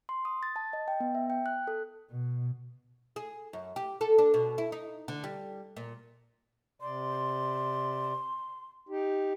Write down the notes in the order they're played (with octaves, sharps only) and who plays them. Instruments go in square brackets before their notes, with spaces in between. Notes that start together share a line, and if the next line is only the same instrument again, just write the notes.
[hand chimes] C6
D#6
A6
A5
D#5
G5
B3
E5
G5
F#6
A4
[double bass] B2
[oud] G#4
F#2
G4
A4
D4
B2
E4
D#4
D3
G3
A#2
[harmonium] C3 D5 [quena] C6
[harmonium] D#4 G4